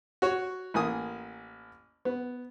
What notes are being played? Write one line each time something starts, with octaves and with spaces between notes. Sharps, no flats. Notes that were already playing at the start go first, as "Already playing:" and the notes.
F#4 C#5
A1 A#3 G#5 D#6
B3